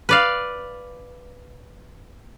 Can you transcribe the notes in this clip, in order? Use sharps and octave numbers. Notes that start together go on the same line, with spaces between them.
B4 D5 F5